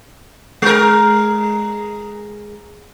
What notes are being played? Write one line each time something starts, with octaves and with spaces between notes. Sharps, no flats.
G#3 A#4